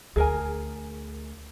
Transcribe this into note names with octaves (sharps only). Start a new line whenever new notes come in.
D2 G#4 A#4 G#5